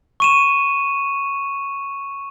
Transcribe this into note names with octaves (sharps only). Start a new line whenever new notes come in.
C#6 D#7 E7